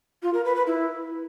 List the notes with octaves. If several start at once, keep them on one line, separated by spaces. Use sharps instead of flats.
F4
A#4
B4
B4
E4